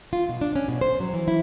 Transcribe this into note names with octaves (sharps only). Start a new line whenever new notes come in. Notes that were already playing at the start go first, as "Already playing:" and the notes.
F4
B2
D4
C#4
B2
C5
F#3
E3
E4